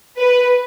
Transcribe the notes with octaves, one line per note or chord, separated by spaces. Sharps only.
B4